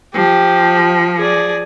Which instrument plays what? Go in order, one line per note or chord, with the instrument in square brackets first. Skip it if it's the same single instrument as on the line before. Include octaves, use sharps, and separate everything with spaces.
[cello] F3 [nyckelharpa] G4
[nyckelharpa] G#4 D5